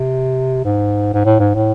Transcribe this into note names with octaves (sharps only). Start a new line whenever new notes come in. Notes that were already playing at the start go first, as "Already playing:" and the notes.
Already playing: C3
G#2
G#2
A2
G#2
A2